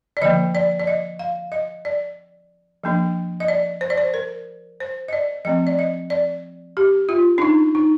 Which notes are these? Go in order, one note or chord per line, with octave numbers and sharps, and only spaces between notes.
D5
D3 F3 A#3 D#5
D5
D5
D#5
F5
D#5
D5
F3 A#3 D4
D#5
D5
C5
D5
C5
A#4
C5
D#5
D5
F3 A3 C4 D#5
D5
D#5
D5
G4
F4
D4
D#4
D#4